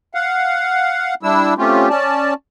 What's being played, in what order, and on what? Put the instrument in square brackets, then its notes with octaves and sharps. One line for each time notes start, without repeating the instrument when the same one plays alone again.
[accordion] F5 F#5
G3 D4 E4 E6
A3 C4 C#4 F4 G4
C#4 D5 A5